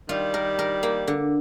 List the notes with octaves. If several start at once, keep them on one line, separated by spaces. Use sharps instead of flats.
D#3 G3 F4
A#4
A#4
A#3
D3